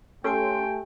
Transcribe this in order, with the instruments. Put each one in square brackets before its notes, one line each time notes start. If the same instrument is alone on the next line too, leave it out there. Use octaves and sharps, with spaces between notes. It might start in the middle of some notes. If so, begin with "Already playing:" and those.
[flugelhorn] A3 [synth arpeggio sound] C#4 A4 C6 [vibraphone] G4 G#5 [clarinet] G5